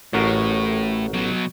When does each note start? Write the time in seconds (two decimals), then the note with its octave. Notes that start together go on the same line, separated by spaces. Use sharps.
0.13 A1 A2 F#4 A#4
1.14 B2 F#3